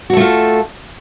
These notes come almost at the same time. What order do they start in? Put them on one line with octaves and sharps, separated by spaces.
F#4 A4 A3 F4